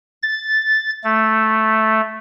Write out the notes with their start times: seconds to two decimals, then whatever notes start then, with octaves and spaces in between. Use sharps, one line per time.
0.22 A6
1.04 A3